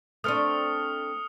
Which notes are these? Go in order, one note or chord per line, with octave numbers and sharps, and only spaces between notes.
A3 C4 D4 D#6 F6 C#7